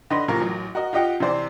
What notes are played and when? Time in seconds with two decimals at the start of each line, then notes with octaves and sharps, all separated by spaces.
0.10 D3 D#4 B4 C6 A#6
0.28 A2 C3 E3 F4 A#4 C#6
0.41 A1 F#3
0.75 F#4 A#4 D#5
0.93 F4 G4 D#5 F#5 G5
1.20 C3 E3 C5 D5